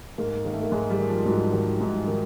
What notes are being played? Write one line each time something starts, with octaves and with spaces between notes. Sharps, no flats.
G#2 A#3
D#3 A#3
A3
A#3
G#2 G#3
G3
D#3
F3
G#2 F#3
D#3 G3
G#2
D#3